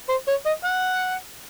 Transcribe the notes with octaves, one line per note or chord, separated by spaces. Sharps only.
C5
C#5
D#5
F#5